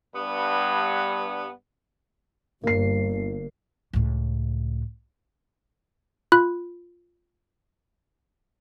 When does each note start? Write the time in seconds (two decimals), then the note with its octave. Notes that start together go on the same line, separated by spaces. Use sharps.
0.15 G2 B3
2.64 G1 A#3 C7
3.93 C#2 A2
6.32 F4 B5 F#6